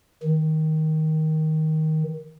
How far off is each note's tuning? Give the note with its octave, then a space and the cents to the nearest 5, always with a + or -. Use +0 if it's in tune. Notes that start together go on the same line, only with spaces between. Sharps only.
D#3 +10